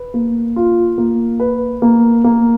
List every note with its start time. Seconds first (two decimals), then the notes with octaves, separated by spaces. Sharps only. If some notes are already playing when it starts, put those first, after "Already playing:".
Already playing: B4
0.14 A#3
0.56 F4
0.98 A#3
1.40 B4
1.82 A#3
2.24 A#3